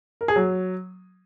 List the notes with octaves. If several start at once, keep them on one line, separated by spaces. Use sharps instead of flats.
A#4
G#4
F#3